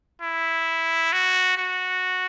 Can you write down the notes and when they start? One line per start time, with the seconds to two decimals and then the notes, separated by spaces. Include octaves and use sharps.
0.22 E4
1.13 F#4
1.58 F#4